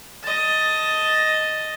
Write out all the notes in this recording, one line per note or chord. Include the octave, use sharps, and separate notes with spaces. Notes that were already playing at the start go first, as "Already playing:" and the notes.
D#5 A5